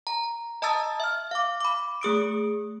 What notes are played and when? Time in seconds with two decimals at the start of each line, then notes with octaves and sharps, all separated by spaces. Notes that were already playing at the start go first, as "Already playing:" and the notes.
0.07 A#5
0.62 D#5 A5 A#5 D#6 E6 A6
1.00 E5 F6
1.31 F5 D6
1.60 B5 D6
2.01 A3 G#4 D#6 D7